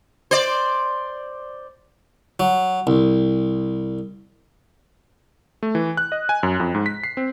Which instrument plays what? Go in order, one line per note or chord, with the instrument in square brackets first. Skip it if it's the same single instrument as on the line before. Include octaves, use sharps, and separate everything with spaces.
[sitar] C5 D5
[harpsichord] F#3
C2
[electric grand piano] A3
E3
F#6
D#5
G#5
F#2
F2
G#2
B6
C7
C4